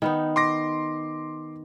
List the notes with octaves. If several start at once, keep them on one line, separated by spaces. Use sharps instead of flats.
D#3 B3 D#4
C6 D6 A#6